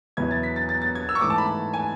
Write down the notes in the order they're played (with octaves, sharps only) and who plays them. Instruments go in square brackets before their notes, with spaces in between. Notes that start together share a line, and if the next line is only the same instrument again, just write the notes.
[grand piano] E2 B2 F#3 B3 E4 [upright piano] G#6
[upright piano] A6
B6
A6
A6
A6
G#6
E6
C#6
[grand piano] G#2 E3 A3 [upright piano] D6
[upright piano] A5
B5
G#5